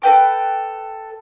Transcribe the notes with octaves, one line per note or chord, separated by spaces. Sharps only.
A4 B4 G5 D6